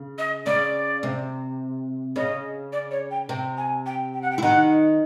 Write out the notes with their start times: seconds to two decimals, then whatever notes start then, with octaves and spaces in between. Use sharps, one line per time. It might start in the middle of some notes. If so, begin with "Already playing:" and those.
Already playing: C#3
0.18 D#5
0.46 C#3 C#4 D5
1.03 C3 C4
2.16 C#3 C#4 D#5
2.72 D5
2.91 C#5
3.11 G5
3.29 C3 C4 G5
3.57 G#5
3.86 G5
4.14 G5
4.22 F#5
4.31 G5
4.38 E4
4.42 D#3 D#4 F#5